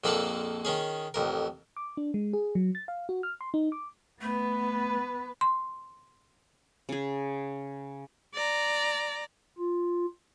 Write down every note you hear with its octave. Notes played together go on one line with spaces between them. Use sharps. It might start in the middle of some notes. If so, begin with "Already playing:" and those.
A#1 F2 A#3 D4 A4 F#5
D#3 C#4 G#4
A1 F2 A#4
D6
D4
G#3
G#4
F#3
A6
F5
F#4
F6
C6
D#4
D6
A3 B3 B4
C6
C#3 G#4
D5 A#5
F4